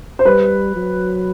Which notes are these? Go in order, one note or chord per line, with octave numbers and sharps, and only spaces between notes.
C5
G3 B4
F#3